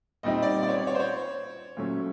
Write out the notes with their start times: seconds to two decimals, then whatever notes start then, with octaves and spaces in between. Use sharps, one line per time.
0.23 A#2 G3 C4 D#4 D#5
0.42 D5
0.63 D5
0.68 C#5
0.74 D5
0.87 C#5
0.95 C5
1.00 C#5
1.77 A#2 F#3 A3 C#4